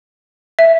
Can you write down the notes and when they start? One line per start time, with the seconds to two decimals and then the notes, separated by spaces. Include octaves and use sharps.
0.59 E5